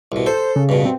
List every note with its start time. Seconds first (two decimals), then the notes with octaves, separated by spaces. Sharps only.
0.12 C2 B2
0.26 A4 C5
0.56 C#3
0.69 G2 B2
0.85 C4